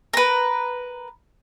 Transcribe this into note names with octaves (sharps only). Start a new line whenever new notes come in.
A#4 B4